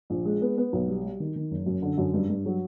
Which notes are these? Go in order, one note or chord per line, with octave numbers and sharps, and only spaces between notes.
A#1
G#3
B3
B3
B1
G3
G3
D#3
D#3
F#1
F#2
D3
F#2
G2
G2
F#3